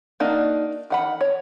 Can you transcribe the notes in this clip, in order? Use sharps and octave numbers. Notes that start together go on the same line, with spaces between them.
A#3 D4 D#4 F#4
D#3 F#5 B5
C#5